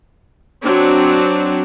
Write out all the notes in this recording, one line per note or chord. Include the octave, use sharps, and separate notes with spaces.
F#3 C4 D4